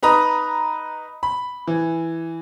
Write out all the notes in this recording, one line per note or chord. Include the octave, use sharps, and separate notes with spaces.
D#4 B4 A#5 D#6
B5
E3